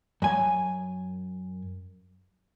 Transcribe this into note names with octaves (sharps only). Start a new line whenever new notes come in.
F#2 G#5